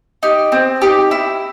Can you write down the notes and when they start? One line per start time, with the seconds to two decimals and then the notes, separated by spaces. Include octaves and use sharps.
0.23 D#4 G4
0.52 C4
0.82 D#4 G4
1.11 E4